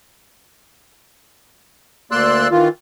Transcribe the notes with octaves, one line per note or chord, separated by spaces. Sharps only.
D2 A#3 D5 C6 E6 F#6
D#3 E3 F4